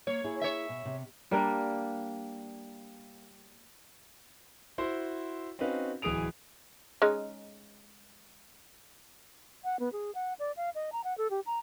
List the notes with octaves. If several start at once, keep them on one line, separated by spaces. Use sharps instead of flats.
A#3 C#5
A#3 E4 G#4
C#5 E5
B2
C3
G3 A#3 D4 A#4
E4 F#4 C5 C6
C4 C#4 D#4 F#4 B4 F5
D1 E3 G#4 D#6 D7 F7
G#3 C#4 D#4
F#5
B3
G#4
F#5
D5
F5
D#5
A#5
F#5
A4
G4
A#5